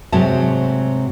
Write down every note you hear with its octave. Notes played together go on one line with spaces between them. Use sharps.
G#2 C3 F#3 A3 A5